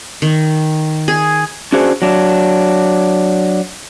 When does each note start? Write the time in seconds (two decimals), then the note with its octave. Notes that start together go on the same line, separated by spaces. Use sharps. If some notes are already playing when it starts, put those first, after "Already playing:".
0.22 D#3
1.08 G#4
1.73 C#4 D4 F#4 G#4 C5
2.02 F#3 D4